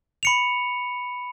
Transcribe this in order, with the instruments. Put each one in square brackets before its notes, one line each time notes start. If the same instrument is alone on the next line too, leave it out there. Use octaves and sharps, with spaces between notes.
[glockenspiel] B5 C#7 F7